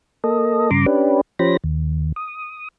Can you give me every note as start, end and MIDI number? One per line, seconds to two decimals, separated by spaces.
0.24 0.70 58
0.24 0.70 69
0.24 0.70 75
0.71 0.86 43
0.71 0.86 49
0.71 0.86 82
0.71 0.86 84
0.71 0.86 86
0.86 1.21 61
0.86 1.21 62
0.86 1.21 67
0.86 1.21 71
1.39 1.57 53
1.39 1.57 61
1.39 1.57 67
1.39 1.57 72
1.39 1.57 83
1.39 1.57 94
1.64 2.12 39
2.16 2.68 87